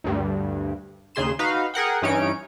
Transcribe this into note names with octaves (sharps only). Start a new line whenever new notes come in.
D2 G2
D#2 C#3 G#4 C6 E7
D#4 F#4 B4 F5
G#4 A#4 F#5 G5
G2 E3 C#4 D#4 C#5 D7